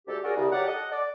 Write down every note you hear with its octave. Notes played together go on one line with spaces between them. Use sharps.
D2 G#2 G4 A4
F#4 G#4 A#4 D5
C2 C#3
F#3 D#4 G4 A#4 D5 F#5
A4 D#5 F#5
D5